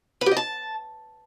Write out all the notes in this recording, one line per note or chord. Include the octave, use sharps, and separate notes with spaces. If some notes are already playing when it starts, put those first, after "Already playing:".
B4
G4
D#5
A5